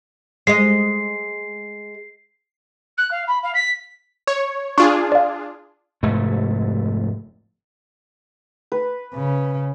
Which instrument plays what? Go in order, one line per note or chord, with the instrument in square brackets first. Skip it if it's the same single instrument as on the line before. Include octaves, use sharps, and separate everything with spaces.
[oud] G#3 D#5 [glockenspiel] C7
[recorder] F#6
F5
B5
F5
B6
[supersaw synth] C#5
[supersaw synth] D4 F4 G#4 [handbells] C#6
[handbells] D5 F5
[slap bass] F1 G#2 C3 A3
[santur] B4
[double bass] C#3